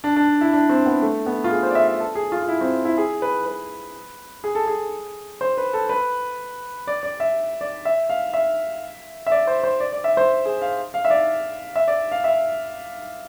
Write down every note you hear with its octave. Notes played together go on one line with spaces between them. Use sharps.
D4
D4
E4
D4
C4
B3
A3
B3
F4
G#4
C5
D5
E5
E5
A4
G#4
F4
F4
E4
C4
E4
G#4
B4
B4
G#4
A4
G#4
C5
B4
A4
B4
D5
D5
E5
D5
E5
F5
E5
E5
D5
C5
C5
D5
D5
E5
C5
G#4
F5
F5
E5
D5
E5
D5
F5
E5